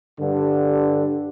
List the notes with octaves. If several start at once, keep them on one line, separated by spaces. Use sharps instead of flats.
G2 D3